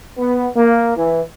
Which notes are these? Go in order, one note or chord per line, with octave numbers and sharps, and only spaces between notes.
B3
A#3
E3